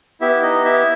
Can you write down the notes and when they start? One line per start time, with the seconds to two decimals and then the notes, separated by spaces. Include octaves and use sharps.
0.21 B3 E4 G4 E5
0.43 D#4 D#5
0.65 E4 E5